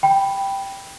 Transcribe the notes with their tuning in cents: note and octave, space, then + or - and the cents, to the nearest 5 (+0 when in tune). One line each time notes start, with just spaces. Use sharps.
G5 +0 B5 +0